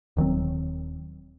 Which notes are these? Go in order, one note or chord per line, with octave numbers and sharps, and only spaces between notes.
D#1 D#3 F#3 C4